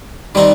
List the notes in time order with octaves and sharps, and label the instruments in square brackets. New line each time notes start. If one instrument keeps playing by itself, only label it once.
[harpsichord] D#3 G3 C4 D#4